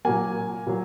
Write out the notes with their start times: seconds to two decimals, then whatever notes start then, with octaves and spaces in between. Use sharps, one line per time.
0.05 A#2 F#3 A#3 G#5
0.67 A#2 F#3